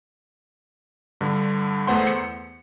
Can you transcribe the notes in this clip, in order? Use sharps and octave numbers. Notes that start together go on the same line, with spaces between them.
G2 D3
E2 A3 B3 C5 F#5 C6
C#7